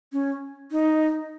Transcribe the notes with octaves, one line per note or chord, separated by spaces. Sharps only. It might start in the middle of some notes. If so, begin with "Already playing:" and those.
C#4
D#4